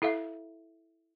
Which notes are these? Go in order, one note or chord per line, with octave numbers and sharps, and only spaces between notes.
E4 A4 E5 F5